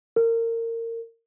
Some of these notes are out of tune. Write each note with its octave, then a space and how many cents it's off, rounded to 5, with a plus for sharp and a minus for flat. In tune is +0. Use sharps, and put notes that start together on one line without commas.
A#4 -25